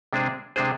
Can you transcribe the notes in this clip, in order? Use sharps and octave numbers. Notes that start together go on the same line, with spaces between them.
C3 G#3 D4 G#4 C5
C3 G#3 D4 G#4 C5